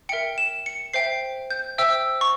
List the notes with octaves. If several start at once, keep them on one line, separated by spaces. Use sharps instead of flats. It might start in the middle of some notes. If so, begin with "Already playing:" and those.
A#4 E5 G5 C#7
E7
C#7
C5 E5 G5 C7
G6
C5 E5 G5 E6
C#6